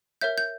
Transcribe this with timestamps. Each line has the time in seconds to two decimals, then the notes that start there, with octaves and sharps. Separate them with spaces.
0.21 A#4 C#5 E5 G6
0.38 G6